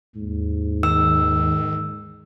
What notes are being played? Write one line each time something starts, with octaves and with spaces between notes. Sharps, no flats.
D#2 G#2
D#3 E6